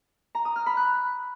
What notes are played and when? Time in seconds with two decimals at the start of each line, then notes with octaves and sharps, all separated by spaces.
0.35 A#5
0.45 D#6
0.56 F6
0.66 B5
0.77 F#6